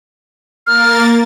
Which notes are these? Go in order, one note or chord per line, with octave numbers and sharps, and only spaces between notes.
A#3 A#4 F6 A6